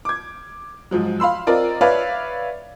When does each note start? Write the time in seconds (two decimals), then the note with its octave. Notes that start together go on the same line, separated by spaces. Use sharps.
0.05 D6 G#6
0.91 G#2 F3 F#3
1.20 F5 B5 C6 E6
1.47 C4 F4 A#4 D5 D#5
1.81 B4 C#5 D5 E5 F5